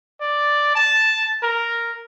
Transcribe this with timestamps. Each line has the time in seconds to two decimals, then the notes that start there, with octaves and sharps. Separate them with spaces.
0.20 D5
0.75 A5
1.43 A#4